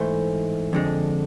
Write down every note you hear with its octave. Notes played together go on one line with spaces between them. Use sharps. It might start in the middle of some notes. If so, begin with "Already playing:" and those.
Already playing: G#2 E3 A3 C5
F2 D3 G#3